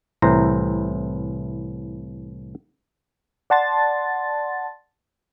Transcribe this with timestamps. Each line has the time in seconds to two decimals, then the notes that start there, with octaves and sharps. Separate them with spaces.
0.22 C2 A2 E3 C5 A#5
3.50 D5 F#5 A5 C6 A6